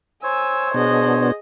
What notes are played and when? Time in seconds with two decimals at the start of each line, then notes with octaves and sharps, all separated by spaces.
0.23 C5 C#5 G#5 E6
0.74 B2 B3 D4 G#4 D#5